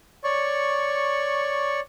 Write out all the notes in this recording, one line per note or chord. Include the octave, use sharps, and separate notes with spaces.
C#5 D5 C#6